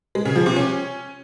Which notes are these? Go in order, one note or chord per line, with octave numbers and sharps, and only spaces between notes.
G#3
C#3
F3
C3
C#4